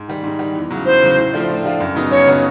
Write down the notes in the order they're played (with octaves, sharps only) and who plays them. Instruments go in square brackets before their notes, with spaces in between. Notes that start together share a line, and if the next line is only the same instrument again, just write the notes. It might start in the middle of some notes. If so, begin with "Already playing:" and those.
Already playing: [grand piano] G#2
D#3 G3
G#2
D#3 G3
E2
C#3 F#3
[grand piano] E2 [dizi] C5
[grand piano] C#3 F#3
A2
F3 A3 D4 F4
A2
F3 A3 D4 F4
F#2
C#3 F#3 B3 D#4
[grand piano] F#2 [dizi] C#5
[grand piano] C#3 F#3 B3 D#4